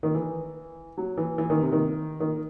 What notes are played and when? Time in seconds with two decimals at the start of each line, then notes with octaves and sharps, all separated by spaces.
0.03 D#3
0.15 E3
0.97 F#3
1.17 E3
1.38 E3
1.50 D#3
1.61 C3
1.72 D#3
2.20 D#3